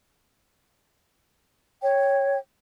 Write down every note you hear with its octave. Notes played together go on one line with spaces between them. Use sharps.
C#5 G5